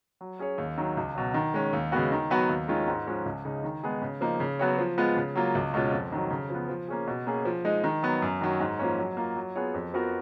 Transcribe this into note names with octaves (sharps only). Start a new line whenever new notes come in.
F#3
C#4 G#4 C#5
D#2
D#3 F#3
C#2
B2 F#3
D#3
G#3 C#4
D#2
C#3 G#3 B3 F#4
D#3
F#3 B3 F#4 B4
D#2
D#3 G#3 C#4 F4
G#2
F3 G#3 C#4
C#2
C#3 G#3 D#4
D#3
G#3 B3 D#4 G#4
C#3
F3 A#3 D#4
C#3
F#3 B3 F#4 C#5
F3
G#3 B3 F4
C#3
F#3 A#3 F4
C#2
B2 G#3 C#4 F4
F2
D#3 F#3
C#3
F3
B3
F3
A#3 C#4 G#4
B2
A#3 C#4 G#4
F3
G#3 D#4
D#3
F#3 B3
F#2
D#3 F#3
G#2
F3 A#3 C#4
F#3
A#3 F4
F#3
B3 F4 G#4 C#5
F2
F3 B3 F#4 A#4